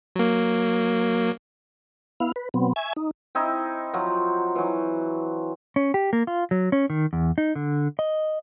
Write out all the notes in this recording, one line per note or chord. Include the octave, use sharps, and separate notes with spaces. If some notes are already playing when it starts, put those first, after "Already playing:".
F#3 A#3
B3 E4 F5
B4
B2 F#3 B3 C4
E5 G#5 C#6 G#6
D#4
C4 D#4 E4
F3 F#3
E3 F#3
C#4
G4
A#3
F4
F#3
C#4
D#3
E2
D#4
D3
D#5